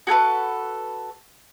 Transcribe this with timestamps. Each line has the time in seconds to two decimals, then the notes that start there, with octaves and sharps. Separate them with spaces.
0.07 F#4 G#4 A4 B4